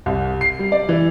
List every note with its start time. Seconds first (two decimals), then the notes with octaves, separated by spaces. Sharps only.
0.06 C2
0.41 C7
0.59 G3
0.72 D5
0.89 E3